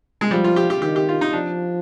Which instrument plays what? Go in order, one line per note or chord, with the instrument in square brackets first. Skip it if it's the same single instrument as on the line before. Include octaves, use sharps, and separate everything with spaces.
[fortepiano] G#3
[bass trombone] F3 [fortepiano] G3
[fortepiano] F4
G4
G4
[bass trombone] D#3 [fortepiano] G4
[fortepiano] G4
F4
D#4
[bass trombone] F3 [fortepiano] D4